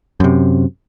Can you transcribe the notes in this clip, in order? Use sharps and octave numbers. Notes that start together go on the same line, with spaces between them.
F#2 C3